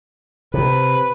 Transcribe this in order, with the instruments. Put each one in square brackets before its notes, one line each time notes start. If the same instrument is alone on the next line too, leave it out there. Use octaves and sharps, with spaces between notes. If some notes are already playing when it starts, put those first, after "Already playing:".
[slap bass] C3 [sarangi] B4